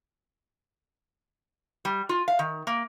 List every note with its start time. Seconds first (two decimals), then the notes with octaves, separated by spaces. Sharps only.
1.85 G3
2.09 F4
2.28 F5
2.39 D#3
2.67 A#3